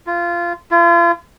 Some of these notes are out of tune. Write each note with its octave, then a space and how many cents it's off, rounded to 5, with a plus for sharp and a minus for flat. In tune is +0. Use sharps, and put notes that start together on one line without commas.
F4 -20
F4 -40